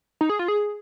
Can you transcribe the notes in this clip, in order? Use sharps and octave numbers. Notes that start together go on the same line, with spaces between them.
D#4
G#4
F4
G#4